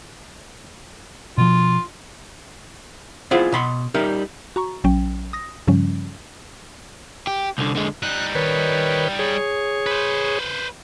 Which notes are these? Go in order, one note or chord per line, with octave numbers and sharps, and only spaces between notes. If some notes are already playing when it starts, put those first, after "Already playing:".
B2 F3 F4
B3 E4 F4 G#4 C5
B2 B5 C6
G3 D#4 A#4 E5
F#4 A#5 C#6
A#1 F#3 C#4 G5
D#6 A#6
G2 C#3 F3 G3 C#4
G4
C2 D3
D3 G#3
G3 D#4 F#6
D#3 B4 C#5
G#4 C#5
B4 C5